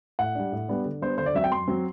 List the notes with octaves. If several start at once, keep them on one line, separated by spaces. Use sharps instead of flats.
A2 F#5
G3 D4
A2
G3 B3 D4
D3
G3 B3 D4 C5
D3 C5
D5
F#3 C4 E5
G5
F#2 C6
F#3 C4